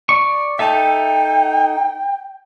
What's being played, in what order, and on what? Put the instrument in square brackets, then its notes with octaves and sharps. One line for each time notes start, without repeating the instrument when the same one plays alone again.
[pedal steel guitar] D5 C#6
[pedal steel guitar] D#4 A4 E5 [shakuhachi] G5